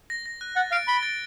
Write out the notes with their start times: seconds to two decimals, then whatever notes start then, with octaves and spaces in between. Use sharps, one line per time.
0.10 A#6
0.26 A#6
0.41 F#6
0.56 F#5 A6
0.71 F5 D7
0.88 B5 G7
1.03 A6